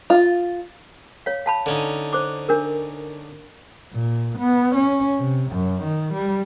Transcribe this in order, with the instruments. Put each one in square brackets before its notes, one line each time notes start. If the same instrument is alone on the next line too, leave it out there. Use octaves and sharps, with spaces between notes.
[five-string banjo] F4
[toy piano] C#5 F5
F5 A5 B5
[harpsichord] D3 C#4 D#4
[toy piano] C5 D6
D4 A#4
[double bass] A#2
B3
C#4
C3
F#2
D#3
G3